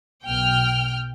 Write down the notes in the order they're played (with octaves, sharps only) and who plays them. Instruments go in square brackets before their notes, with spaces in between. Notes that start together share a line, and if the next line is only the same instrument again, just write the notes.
[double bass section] B1 B2 [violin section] G5 F6